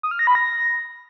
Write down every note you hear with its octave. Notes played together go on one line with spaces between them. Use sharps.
D#6
F6
A#6
B5
A#6